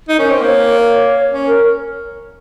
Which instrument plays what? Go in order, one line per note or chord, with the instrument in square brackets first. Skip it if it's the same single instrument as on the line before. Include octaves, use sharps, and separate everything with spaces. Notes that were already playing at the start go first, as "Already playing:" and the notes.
[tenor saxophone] D#4
[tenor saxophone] C#4 [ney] A#4
[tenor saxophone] C4 [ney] C5
[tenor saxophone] A#3 [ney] C#5
[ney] C#5
[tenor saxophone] C#4 [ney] C#5
[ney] A#4